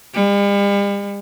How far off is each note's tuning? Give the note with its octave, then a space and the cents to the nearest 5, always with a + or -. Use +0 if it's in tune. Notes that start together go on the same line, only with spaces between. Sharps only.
G3 +45